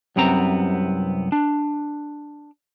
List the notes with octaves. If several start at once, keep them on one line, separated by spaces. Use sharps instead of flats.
C2 F#2 C3 B3 C4 A#5
D4